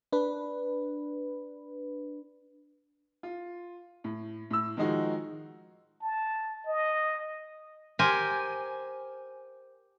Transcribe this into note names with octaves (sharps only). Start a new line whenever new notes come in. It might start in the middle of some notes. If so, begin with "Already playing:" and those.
D4 B4
F4
A2
A2 E6
D#3 F3 G#3 D#4 F#4
A5
D#5
G4 A#4 C5 G#5